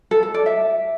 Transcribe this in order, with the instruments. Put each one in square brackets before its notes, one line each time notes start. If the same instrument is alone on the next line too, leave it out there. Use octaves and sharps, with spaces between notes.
[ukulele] A4
A4
D5
E5